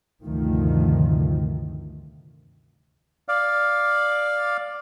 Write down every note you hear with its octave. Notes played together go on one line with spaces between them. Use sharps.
D2 G2 C3 D#3 F3 A3
D5 F5